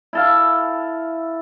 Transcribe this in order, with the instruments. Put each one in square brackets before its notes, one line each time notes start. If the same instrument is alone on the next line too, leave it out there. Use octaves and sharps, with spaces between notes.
[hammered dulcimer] E4 A4 F5